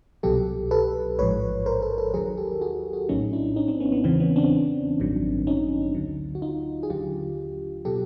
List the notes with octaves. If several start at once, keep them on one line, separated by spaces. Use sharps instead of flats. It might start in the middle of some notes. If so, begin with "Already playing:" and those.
C2 B2 F#3 G4 A4
A4 B4
A1 G#2 F3 B4 C#5
A#4 C5
A4 B4
A#4
A4 B4
D#2 D#3 F#3 G#4 A#4
G4 A4
F#4 G#4
F#4 G#4
A#1 A2 F#3 C#4 D#4
D4 E4
C#4 D#4
C4 D4
B3 C#4
B3
E2 C#3 E3 C4
B3 C#4
C4 D4
A1 G2 D#3 F#3
C#4 D#4
D2 D3 F#3
F#4
D#4 F4
G#4
D#2 D3 F#3 F4 G4
B2 F#3 G4 A4